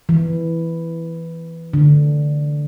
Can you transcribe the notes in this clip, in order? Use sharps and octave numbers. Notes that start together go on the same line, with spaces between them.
E3
D3